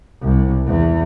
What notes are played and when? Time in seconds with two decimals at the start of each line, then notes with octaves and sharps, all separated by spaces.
0.22 C2
0.67 E2